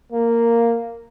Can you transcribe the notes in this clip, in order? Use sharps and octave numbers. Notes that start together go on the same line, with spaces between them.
A#3